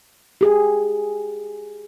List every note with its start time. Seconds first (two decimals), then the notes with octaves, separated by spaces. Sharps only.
0.41 G4 G#4